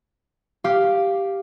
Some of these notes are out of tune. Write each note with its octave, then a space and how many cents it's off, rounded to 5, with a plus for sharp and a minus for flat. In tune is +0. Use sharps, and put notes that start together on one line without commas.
G4 +0 F5 +0